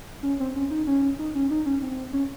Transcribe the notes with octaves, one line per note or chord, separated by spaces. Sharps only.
C#4
C4
C#4
D#4
C#4
D#4
C#4
D#4
C#4
C4
C#4